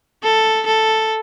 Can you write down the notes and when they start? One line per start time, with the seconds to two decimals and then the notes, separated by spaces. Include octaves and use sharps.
0.23 A4
0.66 A4